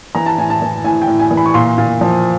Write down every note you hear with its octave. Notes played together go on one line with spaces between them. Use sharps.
E3 A#5
A5
A2 G#5
A5
E3
A2 G#5
G5
A2
G#5
E3
B5
C#6
A#2 C6
A#2
F3